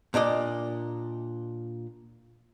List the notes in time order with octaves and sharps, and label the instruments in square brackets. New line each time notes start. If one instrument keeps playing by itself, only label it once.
[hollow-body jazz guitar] A#2 D4 D5 D#5